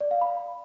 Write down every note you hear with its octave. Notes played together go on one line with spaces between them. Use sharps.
D5
F5
B5